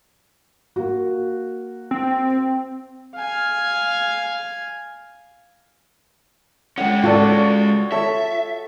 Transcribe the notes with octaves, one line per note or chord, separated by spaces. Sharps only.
A#3 F#4
C4
F5 G#5
G#3 C#4 F#5 G5
F4 F#4 A4 D5
A4 C#5 E5